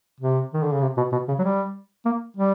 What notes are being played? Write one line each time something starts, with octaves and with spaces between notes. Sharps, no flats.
C3
D#3
D3
C#3
C3
B2
B2
C#3
F#3
G3
A#3
G3